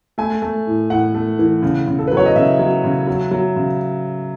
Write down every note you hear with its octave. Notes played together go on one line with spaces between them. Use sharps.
A3 G#5
A3
A2
A2 F#5
A3
E3
C#3
C#3
A4
F#3 B4
C#5
D#5
C#3 E5
F#3
C#3
F#3
F#3
C#3